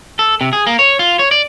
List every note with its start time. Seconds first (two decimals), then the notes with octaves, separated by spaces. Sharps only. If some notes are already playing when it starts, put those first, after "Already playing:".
0.19 A4
0.41 C3
0.53 G#4
0.67 A#3
0.79 C#5
0.99 F4
1.19 C#5
1.31 D5